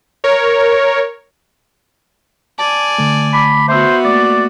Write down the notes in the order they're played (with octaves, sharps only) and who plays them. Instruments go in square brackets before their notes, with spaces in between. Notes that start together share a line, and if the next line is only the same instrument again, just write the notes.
[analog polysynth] A#4 C#5
[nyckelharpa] D5 G#5 [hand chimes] A5
[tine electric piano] D3 A3
[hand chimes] A5 D6 [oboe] B5
[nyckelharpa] B3 F#4 [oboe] C5 [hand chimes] E5 B5 E6
[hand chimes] A3 A#3 [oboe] D5 [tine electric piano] A6